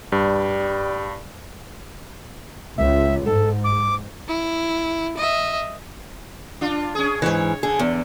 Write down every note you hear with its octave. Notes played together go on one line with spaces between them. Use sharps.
G2 G3
C#2 E5
G#2 A4
D6
E4
D#5 E5
D4 F4
C#4 G#4
G#2 E3 C#5
D3 G#4
E2